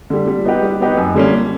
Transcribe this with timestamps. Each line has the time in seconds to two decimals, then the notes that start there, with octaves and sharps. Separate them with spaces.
0.10 D3 G3
0.28 G3
0.45 B3 D#4 G4 B4
0.63 G3
0.80 B3 D#4 G4 B4
0.97 F#2
1.15 D3 G3 A#3 C#4